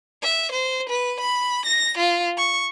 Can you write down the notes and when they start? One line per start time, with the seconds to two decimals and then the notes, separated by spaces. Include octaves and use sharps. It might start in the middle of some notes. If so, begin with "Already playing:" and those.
0.22 E5
0.52 C5
0.89 B4
1.20 B5
1.66 A#6
1.98 F4
2.37 C#6